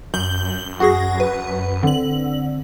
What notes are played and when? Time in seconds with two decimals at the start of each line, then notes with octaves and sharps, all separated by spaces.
0.14 F#2 G6 F#7 G7
0.80 F#4 G#4 F#5 C#6 A#6
1.20 B4
1.83 D3 C4 F#7